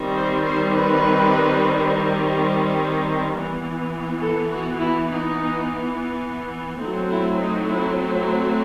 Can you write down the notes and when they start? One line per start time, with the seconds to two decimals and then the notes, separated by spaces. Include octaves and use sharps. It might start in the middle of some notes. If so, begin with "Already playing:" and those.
Already playing: D#3 G3 C4
0.16 C5
0.45 C5
0.74 B4
3.35 E3 B3
4.22 A4
4.50 F#4
4.79 E4
5.08 D#4
6.81 F#3 A3 C4 D#4
7.10 E4
7.39 D#4
7.69 E4
8.11 E4